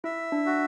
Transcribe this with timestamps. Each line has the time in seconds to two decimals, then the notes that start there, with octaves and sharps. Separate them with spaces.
0.04 E4 E5
0.32 D4
0.46 F#4